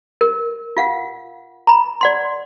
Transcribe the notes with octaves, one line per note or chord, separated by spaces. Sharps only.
A#4
F4 F5 F#5
A#5 B5
D5 F#5 C6